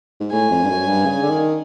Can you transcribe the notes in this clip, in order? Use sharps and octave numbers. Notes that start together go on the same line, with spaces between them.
G#2
A2 G#5
F2
G2
F#2
G2
C#3
D3
D#3